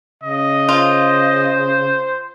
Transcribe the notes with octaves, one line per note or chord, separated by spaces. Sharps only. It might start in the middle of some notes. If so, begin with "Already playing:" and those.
C#3 D#5
F4 C5